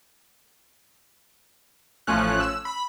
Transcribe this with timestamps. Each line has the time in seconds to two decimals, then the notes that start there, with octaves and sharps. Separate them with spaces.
2.07 A1 F3 A3 C#4 F#6
2.40 E6
2.65 B5